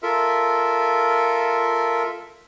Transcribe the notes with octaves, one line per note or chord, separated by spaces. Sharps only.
F4 A4 A#4 E5